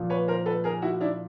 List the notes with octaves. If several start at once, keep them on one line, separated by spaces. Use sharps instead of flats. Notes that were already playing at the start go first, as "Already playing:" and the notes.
Already playing: A#2 F3
B4 C#5
A#4 C5
A4 B4
G#4 A#4
E4 F#4
D4 E4